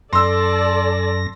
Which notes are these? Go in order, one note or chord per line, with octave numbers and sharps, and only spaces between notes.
F#2 A4 D5 A5 C6 E6 A#6